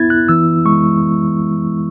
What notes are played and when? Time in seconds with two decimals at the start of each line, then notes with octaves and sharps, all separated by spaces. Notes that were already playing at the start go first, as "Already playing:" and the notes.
Already playing: B3 E4 G#6 A6
0.10 F#6
0.29 E3 E6
0.65 G#3 C#6